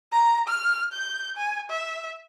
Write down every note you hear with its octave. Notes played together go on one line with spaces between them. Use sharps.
A#5
F6
G6
G#5
E5